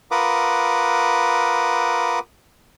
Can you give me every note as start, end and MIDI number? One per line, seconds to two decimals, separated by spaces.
0.11 2.19 65
0.11 2.19 70
0.11 2.19 71
0.11 2.19 78
0.11 2.19 86
0.11 2.19 87